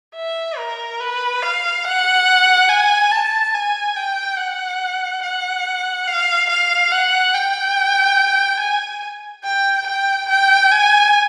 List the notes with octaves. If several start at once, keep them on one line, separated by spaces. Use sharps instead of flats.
E5
A#4
B4
F5
F#5
G#5
A5
G#5
G5
F#5
F#5
F5
F5
F#5
G5
G#5
G5
G5
G5
G#5